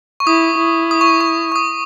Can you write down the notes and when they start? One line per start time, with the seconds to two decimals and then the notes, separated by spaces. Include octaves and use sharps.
0.20 C#6
0.27 E4 D#6
0.59 E4
0.91 D#6
1.01 C#6
1.21 C#6
1.52 C#6
1.56 D#6